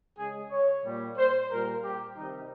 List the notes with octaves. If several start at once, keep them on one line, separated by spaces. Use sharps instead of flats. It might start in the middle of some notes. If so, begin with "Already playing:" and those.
C#3 G#3 G#4
C#5
A#2 G3
C5
A#2 G3 A#4
G4
C3 D#3 G3 D#4